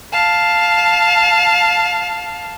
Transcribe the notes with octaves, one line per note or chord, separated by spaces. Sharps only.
F5 A5